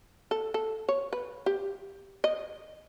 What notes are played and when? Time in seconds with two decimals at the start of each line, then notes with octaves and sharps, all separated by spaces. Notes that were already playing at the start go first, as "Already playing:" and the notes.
0.31 A4
0.54 A4
0.89 C#5
1.13 B4
1.46 G4
2.24 D#5